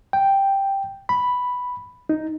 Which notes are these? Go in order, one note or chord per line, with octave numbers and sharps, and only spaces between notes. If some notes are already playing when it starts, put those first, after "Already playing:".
G5
B5
D#4